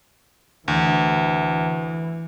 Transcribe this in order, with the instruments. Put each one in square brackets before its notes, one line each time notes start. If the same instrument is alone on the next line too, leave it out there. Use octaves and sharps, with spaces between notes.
[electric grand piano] D2 [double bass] E3